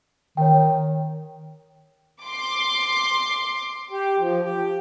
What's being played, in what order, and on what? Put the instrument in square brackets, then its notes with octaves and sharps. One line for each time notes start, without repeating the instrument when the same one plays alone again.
[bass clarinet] D#3 [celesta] C#5 G5
[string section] C6 D6
[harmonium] G4
F3
G4